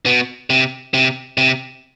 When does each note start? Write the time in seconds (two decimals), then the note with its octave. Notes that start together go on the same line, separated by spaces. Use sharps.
0.06 B2
0.50 C3
0.94 C3
1.38 C3